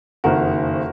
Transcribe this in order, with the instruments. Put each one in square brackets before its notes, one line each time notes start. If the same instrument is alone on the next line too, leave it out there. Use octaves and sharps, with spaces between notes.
[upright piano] F#1 F2 D#3 F#4 A#4